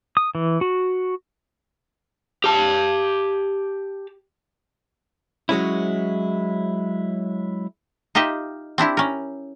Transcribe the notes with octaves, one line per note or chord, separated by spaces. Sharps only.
D#6
E3
F#4
G4 A5
F#3 G#3 C#4 E4
D#4 F4 G4 D#5 E5
C4 D4 E4 G4
C#4 A#4